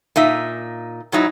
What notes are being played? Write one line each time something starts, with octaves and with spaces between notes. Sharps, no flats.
A#2 D#4 E5
G#2 F#3 D#4 E4